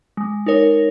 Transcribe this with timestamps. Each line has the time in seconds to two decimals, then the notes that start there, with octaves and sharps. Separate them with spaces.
0.17 G#3
0.46 D#4 A#4 C#5